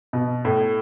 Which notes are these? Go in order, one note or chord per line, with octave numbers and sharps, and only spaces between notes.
B2
A2